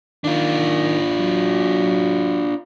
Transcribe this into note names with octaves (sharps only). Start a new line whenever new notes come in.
D#3 D4 F4
F#3